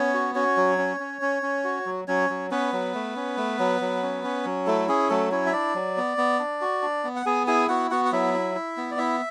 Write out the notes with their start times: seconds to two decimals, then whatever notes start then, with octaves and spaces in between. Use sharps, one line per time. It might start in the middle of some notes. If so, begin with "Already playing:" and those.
Already playing: B3 C#4 C#5
0.14 F#4
0.35 C#4 F#4 C#5
0.57 F#3
0.78 C#4
1.00 C#4
1.22 C#4
1.43 C#4
1.64 F#4
1.86 F#3
2.08 F#3 C#4 C#5
2.30 F#3
2.51 B3 C#4 B4
2.73 F#3
2.94 A3
3.16 C#4
3.37 A3
3.59 F#3
3.81 F#3
4.03 C#4
4.24 C#4
4.45 F#3
4.66 A3 E4 A4
4.88 C#4 G#4
5.10 F#3 A3 A4
5.31 C#4 E4 C#5
5.46 E5
5.53 D4 D5
5.75 F#3
5.97 B3
6.18 B3
6.39 D4
6.61 F#4
6.82 D4
7.04 B3
7.16 F#5
7.26 B3 G#4 G#5
7.47 E4 G#4 G#5
7.68 B3 F#4 F#5
7.91 B3 F#4 F#5
8.05 F#5
8.12 F#3 E4 E5
8.34 E4
8.55 E4
8.77 B3
8.91 D5
8.98 E4 E5